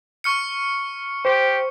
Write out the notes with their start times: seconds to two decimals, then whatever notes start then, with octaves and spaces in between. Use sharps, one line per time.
0.24 C#6 F6 C#7
1.25 G4 C5